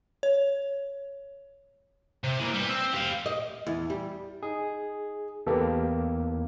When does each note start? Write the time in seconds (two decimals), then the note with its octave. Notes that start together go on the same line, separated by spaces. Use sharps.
0.23 C#5
2.24 C3
2.39 E3 A#3
2.54 G3 B4
2.68 C4
2.94 G4 F5
3.26 D#5
3.67 E2
3.90 G3
4.43 D#4 G#4
5.47 E2 A#3 G4 A4 B4